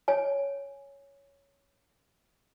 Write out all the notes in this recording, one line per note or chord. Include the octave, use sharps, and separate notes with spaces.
C#5 G#5